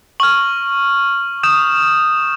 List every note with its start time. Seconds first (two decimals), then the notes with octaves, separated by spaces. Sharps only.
0.20 C#6 F6 F#7
1.43 D#6 G6 E7